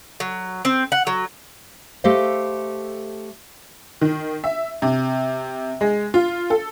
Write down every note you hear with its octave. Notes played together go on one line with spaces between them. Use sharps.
F#3
C4
F#5
F#3
A3 G4 A4 C5 D#5 F5
D#3
E5
C3
G#3
F4
A4